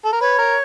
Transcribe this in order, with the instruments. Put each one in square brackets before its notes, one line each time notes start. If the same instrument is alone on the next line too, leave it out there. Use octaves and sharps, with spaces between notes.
[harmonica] A4
A#4
[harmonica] B4 [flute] C#5
[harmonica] A#4